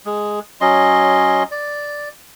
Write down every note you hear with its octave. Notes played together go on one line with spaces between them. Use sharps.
G#3
F#3 C#4 D#5 C6
D5